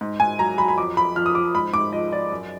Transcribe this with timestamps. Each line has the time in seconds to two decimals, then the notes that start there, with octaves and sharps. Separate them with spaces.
0.01 G#2
0.20 G#2 G#5
0.39 F#3 A#5
0.58 F#3 B5
0.68 B5
0.78 F2 D6
0.97 F2 B5
1.16 F3 F6
1.26 D#6
1.35 F3 D6
1.55 G#2 B5
1.73 G#2 D6
1.93 F3 D#5
2.12 F3 D5
2.32 F#2